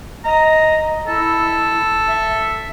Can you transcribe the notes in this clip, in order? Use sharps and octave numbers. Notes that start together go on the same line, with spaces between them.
D#5 A#5
E4 A4
E5